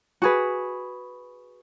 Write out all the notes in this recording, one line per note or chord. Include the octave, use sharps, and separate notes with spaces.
F#4 G#4 B4